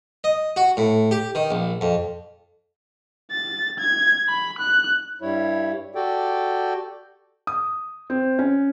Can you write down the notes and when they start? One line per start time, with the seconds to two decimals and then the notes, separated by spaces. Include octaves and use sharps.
0.24 D#5
0.56 F#4
0.77 A2
1.11 G4
1.35 D#3
1.51 A#1
1.81 F2
3.32 A6
3.79 G#6
4.28 B5
4.59 F#6
5.21 G2 G3 E4 C#5
5.95 F#4 G4 A4 D5 G5
7.47 D#6
8.10 C4
8.39 C#4